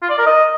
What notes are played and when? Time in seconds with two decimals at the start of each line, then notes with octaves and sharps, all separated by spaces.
0.02 F4
0.10 D5
0.18 A#4
0.26 D#5